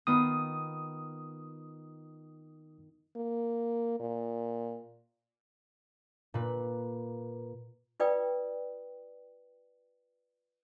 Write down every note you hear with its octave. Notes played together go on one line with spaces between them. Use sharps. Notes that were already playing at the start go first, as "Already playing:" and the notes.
D#3 B3 F4 D#6
A#3
A#2
A#2 B4
F4 B4 D5 G5 D#6